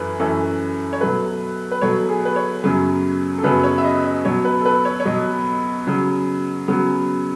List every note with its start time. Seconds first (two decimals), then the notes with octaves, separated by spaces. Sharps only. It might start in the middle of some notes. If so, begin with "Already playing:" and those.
Already playing: F#2 E3 A3 C#4 B4
0.19 F#2 E3 A3 C#4 A4
0.93 C#5
1.00 B2 F#3 A3 B4
1.71 B4
1.81 B2 F#3 A3 C#5
2.09 G#4
2.25 B4
2.36 C#5
2.63 F#2 C#3 F#3 B3
3.38 A4
3.43 F#2 C#3 F#3 B3 B4
3.64 C#5
3.78 E5
3.84 D#5
4.04 D#5
4.25 B2 F#3 B3 C#5
4.45 B4
4.61 A4
4.65 B4
4.85 C#5
5.00 C#5
5.05 B2 F#3 B3 D#5
5.87 C#3 F#3 B3
6.68 C#3 F#3 B3